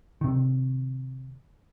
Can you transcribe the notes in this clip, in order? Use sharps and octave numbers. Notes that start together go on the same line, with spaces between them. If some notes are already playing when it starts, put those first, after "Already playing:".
C3 D#3